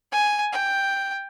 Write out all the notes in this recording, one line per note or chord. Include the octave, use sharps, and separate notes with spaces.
G#5
G5